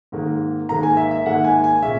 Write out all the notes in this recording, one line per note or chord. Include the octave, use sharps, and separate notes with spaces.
G#2 D#3 A#3
G#2 D#3 A#3 A#5
G#5
E5
E5
G#2 D#3 A#3 F#5
G#5
G#5
A#2 G#3 C#4 E5